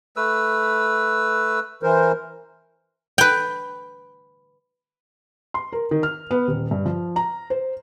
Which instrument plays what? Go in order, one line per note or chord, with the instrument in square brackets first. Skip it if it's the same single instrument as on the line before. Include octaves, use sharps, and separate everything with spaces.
[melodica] A3 B4 E6
[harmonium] E3 A#4 C5
[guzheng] B4 G5
[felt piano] C6
A#4
D#3
F6
B3
D#1
G2
F3
A#5
C5